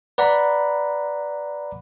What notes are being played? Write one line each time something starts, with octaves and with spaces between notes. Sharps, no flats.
B4 D5 F#5 A#5 B5